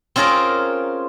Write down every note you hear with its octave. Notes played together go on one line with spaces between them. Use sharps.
C4 C#4 F4 G#4 A#4